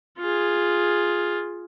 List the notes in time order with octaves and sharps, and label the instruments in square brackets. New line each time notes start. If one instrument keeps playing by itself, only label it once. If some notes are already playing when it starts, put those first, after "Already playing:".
[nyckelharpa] F4 G#4